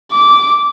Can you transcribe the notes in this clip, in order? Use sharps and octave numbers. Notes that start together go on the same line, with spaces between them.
D6